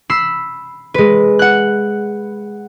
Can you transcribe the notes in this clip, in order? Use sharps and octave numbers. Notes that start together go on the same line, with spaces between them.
B5 E6 B6 C7
G#3 B4
F#5 F#6